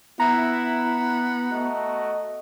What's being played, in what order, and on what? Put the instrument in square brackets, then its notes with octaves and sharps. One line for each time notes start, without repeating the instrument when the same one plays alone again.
[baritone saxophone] B3 [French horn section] E4 [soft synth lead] A#5
[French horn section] A3 F#4 D#5